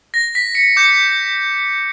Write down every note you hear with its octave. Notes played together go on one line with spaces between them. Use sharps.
A#6
B6
C#7
D6 G6 C#7